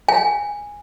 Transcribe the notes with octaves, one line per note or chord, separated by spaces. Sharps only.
G#5